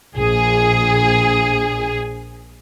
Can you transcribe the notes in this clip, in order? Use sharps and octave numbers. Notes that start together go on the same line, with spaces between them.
A#1 G#4